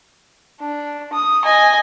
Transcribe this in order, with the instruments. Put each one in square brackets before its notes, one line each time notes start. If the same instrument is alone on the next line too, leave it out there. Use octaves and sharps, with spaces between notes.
[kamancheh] D4
D#6
D#5 G#5